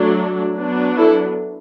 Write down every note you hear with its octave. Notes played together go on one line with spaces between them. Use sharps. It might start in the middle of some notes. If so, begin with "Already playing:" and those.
Already playing: F#3 A3 D4
F#3 B3 D4
E4 A4